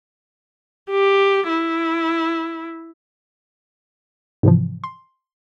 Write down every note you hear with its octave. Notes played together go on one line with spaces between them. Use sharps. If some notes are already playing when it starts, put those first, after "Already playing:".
G4
E4
G#2 C3 E3 F3
C6